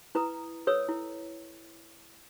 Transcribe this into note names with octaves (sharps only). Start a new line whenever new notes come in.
E4 B4 A#5 D#6
A4 B4 C#5 E6
E4